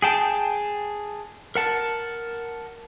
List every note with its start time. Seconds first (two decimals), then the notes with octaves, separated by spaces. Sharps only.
0.02 G#4 G5 A5
1.55 A#4 F#5 A5